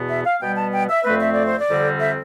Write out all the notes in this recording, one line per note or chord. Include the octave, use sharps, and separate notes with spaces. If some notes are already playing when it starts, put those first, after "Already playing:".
Already playing: E2 B2 B3
E5
F5
B2 G3 B3 G5
A5
G5
E5
F2 D3 A3 C4 B4
E5
D5
C5
D5
F2 D3 G3 C4
E5